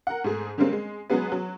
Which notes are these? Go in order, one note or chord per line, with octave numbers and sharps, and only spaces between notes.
A#4 F#5
G#2 A3 G#4
D3 G3 G#3 A#3 C4 C#4
G#3
F#3 G#3 B3 G#4 B4
F#3